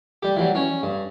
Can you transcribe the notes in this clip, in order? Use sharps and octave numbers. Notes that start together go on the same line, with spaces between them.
G3 G4
E3 F#3 G3
C#4 C#5
G2